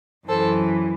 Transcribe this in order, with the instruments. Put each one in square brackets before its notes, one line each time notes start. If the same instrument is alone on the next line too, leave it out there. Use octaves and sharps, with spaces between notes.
[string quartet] F#2 E3 A4 C5